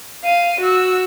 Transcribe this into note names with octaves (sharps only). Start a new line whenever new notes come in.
F5 D#7
F#4 E6